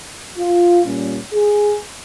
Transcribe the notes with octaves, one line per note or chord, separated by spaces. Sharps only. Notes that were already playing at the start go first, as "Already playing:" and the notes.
F4
A#2 G3 C#4
G#4